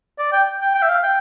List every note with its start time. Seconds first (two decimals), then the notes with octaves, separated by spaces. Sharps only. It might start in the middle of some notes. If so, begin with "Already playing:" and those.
0.19 D5
0.32 G5
0.61 G5
0.75 G5
0.82 E5
0.89 F5
1.03 G5